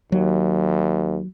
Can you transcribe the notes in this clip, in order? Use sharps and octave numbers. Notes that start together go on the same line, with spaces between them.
D#2 F#3